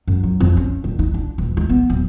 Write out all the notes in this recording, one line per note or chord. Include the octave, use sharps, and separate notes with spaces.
F#2
F#3
F2
C#4
D#1
D#4
D4
D#1
G#3
B3
D1